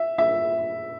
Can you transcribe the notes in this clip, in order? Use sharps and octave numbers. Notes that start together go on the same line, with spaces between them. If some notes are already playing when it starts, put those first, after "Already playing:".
Already playing: E5
E5